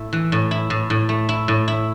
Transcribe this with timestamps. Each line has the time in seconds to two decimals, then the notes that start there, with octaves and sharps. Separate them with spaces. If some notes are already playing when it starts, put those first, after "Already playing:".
Already playing: A2 A3 E4
0.13 E3
0.32 A2
0.51 E4
0.70 A2
0.90 A2
1.09 A3
1.29 E4
1.48 A2
1.68 E4